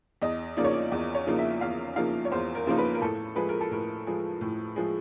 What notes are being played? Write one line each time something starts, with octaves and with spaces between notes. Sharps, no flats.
E2 D#5
C#3 F3 A#3 D#4 D5
C#5
D5
E2
C#5
C#3 F3 A#3 D#4
E5
E2 F5
C#3 F3 A#3 D#4 F5
C#5
E2 C5
A#4
C#3 F3 A#3 D#4 C5
B4
A#4
A2 A4
F3 G#3 B4
A#4
A4
A2 A#4
F3 G#3
A2
F3 G#3